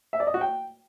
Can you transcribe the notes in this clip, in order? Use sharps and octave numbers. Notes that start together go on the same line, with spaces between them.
E5
D5
D#5
F#4
G5